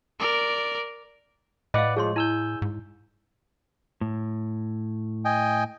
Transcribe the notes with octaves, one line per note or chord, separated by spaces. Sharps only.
A#4 D5
A2 B4 D5 D#5 F5 F#5
F3 G#3 G#4 C#5 C6
E4 G#5 E6 G6
G#2
A2
D#5 G5 G#5